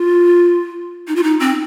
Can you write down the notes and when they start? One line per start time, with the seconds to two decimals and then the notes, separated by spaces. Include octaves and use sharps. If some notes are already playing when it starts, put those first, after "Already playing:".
Already playing: F4
1.08 D#4
1.16 F4
1.23 D#4
1.40 C4